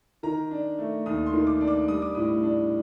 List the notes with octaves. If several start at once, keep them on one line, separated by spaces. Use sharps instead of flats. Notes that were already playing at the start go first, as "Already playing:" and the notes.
D#3 A#5
D4
A3
D#2 D#6
C6
D#3
D6
D4
D6
G3 D#6
D6
A2 D#6
D4